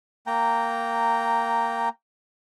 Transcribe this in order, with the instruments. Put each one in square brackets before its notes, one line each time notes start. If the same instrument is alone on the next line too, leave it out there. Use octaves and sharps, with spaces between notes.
[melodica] A#3 G5 A#5